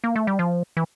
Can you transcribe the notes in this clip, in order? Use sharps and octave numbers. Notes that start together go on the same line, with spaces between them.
A#3
A3
G3
F3
E3